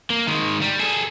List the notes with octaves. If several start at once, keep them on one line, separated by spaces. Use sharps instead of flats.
A#3
D#3 G#3
G3
G#4 A4